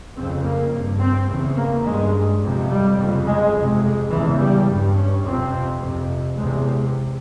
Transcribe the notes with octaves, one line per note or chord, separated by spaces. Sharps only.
F2 C#3 C4
A#3
G2
C4
E2 C#3
A#3
G2 G#3
F2 C3
G3
F2 C#3
G#3
F2 C3
G#3
E2 C#3 E3
G3
G2
C#4
F2 C3 C4
F2 C3
E2 C3 G#3